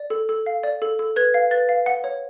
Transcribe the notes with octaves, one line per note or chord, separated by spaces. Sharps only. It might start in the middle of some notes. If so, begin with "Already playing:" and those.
Already playing: D5
A4
A4
F5
D5
A4
A4
B4 G#6
F5
B4 A6
F5
F#5
C#5